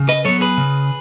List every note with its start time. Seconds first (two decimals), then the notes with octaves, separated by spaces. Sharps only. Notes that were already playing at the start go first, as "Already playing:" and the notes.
Already playing: C#3
0.09 B4 D#5
0.25 F#3 B3 A4 C#5
0.41 G#4 B4
0.58 C#3